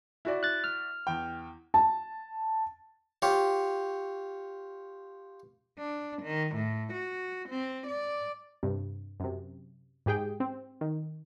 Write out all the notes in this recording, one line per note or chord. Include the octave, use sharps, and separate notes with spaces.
E4 F#4 D5
F#6 A6
F6
E2 G5
A5
F4 G4 C#5
D4
D#3
A2
F#4
C4
D5
G2 C3
F#2 C3
G#2 G4 G#4 G5
C4
D#3